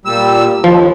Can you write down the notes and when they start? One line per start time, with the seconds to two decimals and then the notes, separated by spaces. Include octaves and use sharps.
0.05 A#2 G3 E6
0.64 D#2 F3